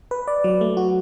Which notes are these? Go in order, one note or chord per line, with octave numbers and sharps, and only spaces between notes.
B4
D5
F#3
A3
F#4